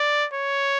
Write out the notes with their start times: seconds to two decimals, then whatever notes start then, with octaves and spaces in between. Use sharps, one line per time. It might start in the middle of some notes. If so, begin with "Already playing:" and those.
Already playing: D5
0.34 C#5